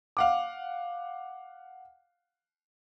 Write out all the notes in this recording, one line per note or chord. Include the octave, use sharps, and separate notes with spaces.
F5 F#5 D6